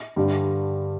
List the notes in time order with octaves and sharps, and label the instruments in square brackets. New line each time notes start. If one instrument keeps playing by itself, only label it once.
[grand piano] G2 D3 G3